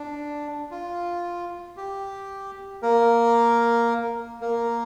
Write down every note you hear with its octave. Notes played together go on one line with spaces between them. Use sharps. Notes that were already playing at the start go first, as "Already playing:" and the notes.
Already playing: D4
F4
G4
A#3 A#4
A#3 A#4